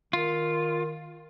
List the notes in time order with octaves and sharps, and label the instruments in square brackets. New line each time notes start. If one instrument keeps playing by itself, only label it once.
[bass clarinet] D#3 [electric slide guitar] F4